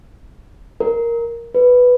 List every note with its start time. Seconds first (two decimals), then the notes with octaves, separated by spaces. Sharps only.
0.80 A#4
1.55 B4